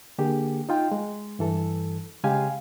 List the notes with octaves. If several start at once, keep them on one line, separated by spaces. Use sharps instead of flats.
D3 A#3 G4 G#4
D#4 F4 G5
G#3
G2 E3 A4
C#3 G#3 G4 F5 G#5